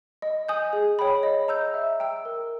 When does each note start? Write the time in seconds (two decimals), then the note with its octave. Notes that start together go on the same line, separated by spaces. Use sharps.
0.22 D#5
0.49 G#5 D#6 G6
0.73 G#4
0.99 C#5 G5 B5
1.23 D#5
1.48 A#5 E6 G6
1.74 E5
2.00 G5 A#5 E6
2.25 A#4